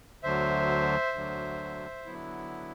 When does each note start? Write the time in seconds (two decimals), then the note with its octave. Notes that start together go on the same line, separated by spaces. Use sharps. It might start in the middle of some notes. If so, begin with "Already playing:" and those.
0.23 D2 D3 F#3 C5 E5
1.14 D2 D3 F#3
2.05 D3 F#3 B3 E4